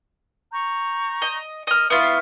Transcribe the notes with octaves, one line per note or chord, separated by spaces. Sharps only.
A#5 C#6 G6
D#5
A#4 D#5 F6
B3 E4 F4 E5 C#6 F6